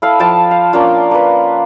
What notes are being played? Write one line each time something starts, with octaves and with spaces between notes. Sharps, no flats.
E4 A4 F5
F3 C5 G5 A5
F5
A#3 C#4 D4 F4
A#3 B4